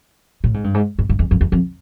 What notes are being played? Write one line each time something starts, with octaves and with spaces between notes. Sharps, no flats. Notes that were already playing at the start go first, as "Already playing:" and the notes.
A2
G#2
G2
G#2
G#2
G2
E2
F2
E2
F2